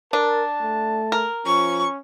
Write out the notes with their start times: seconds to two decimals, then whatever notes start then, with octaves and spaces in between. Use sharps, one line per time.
0.13 D4 A#4 A5
0.63 A3
1.12 A#4
1.46 F3 C#4 C#6